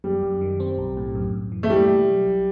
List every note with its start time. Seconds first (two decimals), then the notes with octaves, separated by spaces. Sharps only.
0.04 F#2 G3
0.23 F#2
0.41 D#3
0.60 C4
0.78 B1
0.97 A2
1.15 F#2
1.33 F#2
1.52 E3
1.63 A3
1.70 G3 E4
1.89 B2
2.08 F#3
2.26 B1